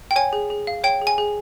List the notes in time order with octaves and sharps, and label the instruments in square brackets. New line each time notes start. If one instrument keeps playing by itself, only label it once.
[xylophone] G5
C#5 G#5
G#4
G#4
F5
C#5 G5
G#4
G#5
G#4